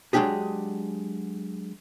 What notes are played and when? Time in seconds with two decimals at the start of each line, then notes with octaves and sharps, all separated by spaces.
0.13 F#3 G#3 B3 D4 G4 G#4